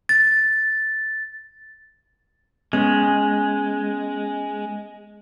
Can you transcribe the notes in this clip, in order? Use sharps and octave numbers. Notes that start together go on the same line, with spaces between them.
A6
G#3 B3 C#4